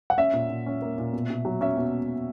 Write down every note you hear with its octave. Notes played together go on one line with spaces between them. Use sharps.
F#5
C#4 E5
A#2
A#2
C#4
A#3
A#2
B2
B2
F#3
C#4 E5
B2